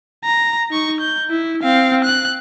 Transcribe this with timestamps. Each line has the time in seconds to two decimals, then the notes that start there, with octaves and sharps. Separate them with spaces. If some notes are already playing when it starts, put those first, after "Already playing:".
0.25 A#5
0.71 D#4 C#6
1.01 G6
1.30 E4
1.63 C4 F5
2.04 F#6